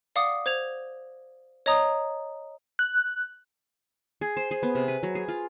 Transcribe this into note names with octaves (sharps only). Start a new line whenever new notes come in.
D5 F5 F#5 D6 D#6
C5 G#6 F7
C#5 D#5 A#5 D#6
F#6
G#4
C5
G#4
B3
C3
B4
F#3
G#4
F4